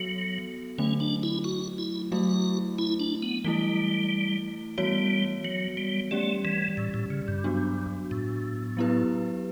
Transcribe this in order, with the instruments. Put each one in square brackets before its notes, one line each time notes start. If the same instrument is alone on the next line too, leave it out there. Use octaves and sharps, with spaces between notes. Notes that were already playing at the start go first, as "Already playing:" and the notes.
Already playing: [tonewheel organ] F#3 [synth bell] B3 F#4 A4
[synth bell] D3 F#3 A3 [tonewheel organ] C#4
[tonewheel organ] D4
E4
F#4
E4
[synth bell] F#3 A3 E4 [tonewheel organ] F#4
[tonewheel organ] E4
D4
B3
[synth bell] E3 A3 E4 [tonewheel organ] G3
[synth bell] E3 B3 F#4 C#5 [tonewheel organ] G3
[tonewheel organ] F#3
G3
[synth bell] G3 C#4 G4 D5 [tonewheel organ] A3
[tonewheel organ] E3
A2
A2
C#3
G2
[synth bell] F#3 B3 D4 F#4
[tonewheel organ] A2
[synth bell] F#3 B3 E4 G4 B4